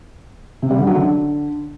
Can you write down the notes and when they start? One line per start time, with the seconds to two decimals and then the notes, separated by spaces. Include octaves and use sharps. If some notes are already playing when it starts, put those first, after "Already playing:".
0.62 C3
0.71 G3
0.79 D3
0.87 F#3
0.95 D3